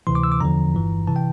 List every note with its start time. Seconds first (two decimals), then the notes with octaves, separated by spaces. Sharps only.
0.07 D2 C3 E3 C6
0.15 D6
0.24 E6
0.32 D6
0.40 E2 D3 F3 A#5
0.74 G1 G2 E3
1.07 C3 E3 A5
1.16 G5